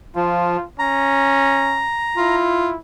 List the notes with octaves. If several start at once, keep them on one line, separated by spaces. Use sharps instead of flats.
F3 F4
C#4 A#5
E4 F4